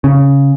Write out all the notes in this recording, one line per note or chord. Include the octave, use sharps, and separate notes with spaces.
C#3